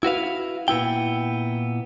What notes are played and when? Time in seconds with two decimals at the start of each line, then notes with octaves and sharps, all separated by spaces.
0.03 E4 F#4 B4 F5
0.68 A#2 B3 E4 G5